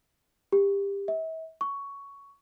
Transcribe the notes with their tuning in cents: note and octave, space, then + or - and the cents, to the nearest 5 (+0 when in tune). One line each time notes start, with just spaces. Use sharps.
G4 +25
E5 -40
C#6 +10